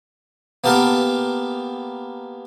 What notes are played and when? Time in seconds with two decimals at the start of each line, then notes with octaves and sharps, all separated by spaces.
0.64 A#3 B3 G4 A4 A#4